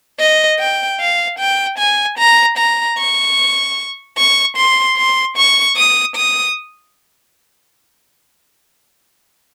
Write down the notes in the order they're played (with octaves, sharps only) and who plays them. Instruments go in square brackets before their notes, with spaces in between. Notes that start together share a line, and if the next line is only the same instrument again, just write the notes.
[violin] D#5
G5
F5
G5
G#5
A#5
A#5
C#6
C#6
C6
C6
C#6
D#6
D#6